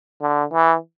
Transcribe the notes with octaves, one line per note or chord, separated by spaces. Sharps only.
D3
E3